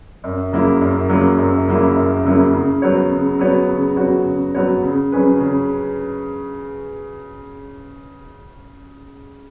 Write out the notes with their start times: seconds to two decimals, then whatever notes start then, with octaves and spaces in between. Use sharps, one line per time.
0.24 F#2
0.52 C#3 F#3 A#3 E4
0.81 F#2
1.10 C#3 F#3 A#3 E4
1.38 F#2
1.68 C#3 F#3 A#3 E4
1.96 F#2
2.24 C#3 F#3 A#3 E4
2.53 C#3
2.82 F#3 B3 F#4 C#5
3.11 C#3
3.39 F#3 B3 F#4 C#5
3.68 C#3
3.97 F#3 B3 F#4 C#5
4.26 C#3
4.55 F#3 B3 F#4 C#5
4.83 C#3
5.12 F#3 C#4 G#4 B4
5.40 C#3